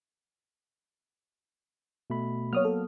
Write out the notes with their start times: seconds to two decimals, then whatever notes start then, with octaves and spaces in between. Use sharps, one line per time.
2.10 B2 A3 B5
2.53 F#3 A#3 B3 C#5 D#6 F6
2.65 A4